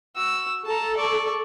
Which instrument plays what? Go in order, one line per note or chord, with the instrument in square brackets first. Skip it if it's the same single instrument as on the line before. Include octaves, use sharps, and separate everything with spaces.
[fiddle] F#4 E6
[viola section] A4 [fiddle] A5 A#5
[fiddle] D5 C#6